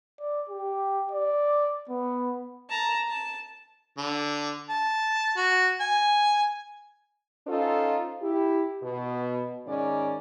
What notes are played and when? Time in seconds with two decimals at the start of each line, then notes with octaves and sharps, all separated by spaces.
0.20 D5
0.49 G4
1.12 D5
1.89 B3
2.69 A5 A#5
3.08 A5
3.97 D3
4.69 A5
5.37 F#4
5.80 G#5
7.47 C#4 D#4 F4 A4 C5
8.21 E4 G4
8.82 B2
9.66 G#2 D#3 C#4 D5